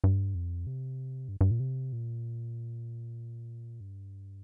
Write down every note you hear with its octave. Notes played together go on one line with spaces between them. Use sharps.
G2
F2
C3
G2
G2
A#2
C3
A#2
G2